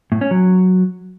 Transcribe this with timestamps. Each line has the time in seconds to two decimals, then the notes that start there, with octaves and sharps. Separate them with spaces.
0.12 A2
0.21 C#4
0.31 F#3